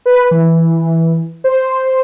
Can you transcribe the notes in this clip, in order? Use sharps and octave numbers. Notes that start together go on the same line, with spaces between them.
B4
E3
C5